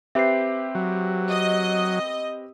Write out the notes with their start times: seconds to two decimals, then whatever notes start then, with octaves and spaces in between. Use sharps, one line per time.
0.15 C4 G4 B4 E5 C7
0.75 F#3
1.29 D#5